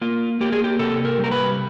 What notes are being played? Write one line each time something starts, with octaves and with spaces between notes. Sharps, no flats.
A#3 F4
A#3 G4
G#4
G4
C3 A4
A#4
G3
A#4
B4